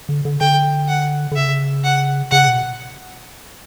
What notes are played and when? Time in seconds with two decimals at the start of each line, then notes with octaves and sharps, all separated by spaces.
0.09 D3
0.25 D3
0.40 D3 G5
0.88 F#5
1.32 D3
1.36 C#3 E5
1.84 F#5
2.31 C#3 F#5
2.48 B2